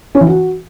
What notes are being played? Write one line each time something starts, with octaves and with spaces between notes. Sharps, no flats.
C#4
E3
F#4